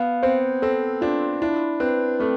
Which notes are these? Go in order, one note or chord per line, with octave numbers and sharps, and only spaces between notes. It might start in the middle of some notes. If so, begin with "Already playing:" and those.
Already playing: B3 F5
C4 C5
C4 A4
D4 F4
D4 E4
C4 B4
A3 C4